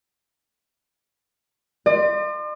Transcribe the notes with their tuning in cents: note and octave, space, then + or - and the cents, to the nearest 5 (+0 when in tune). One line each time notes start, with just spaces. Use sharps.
D5 +45 C6 +0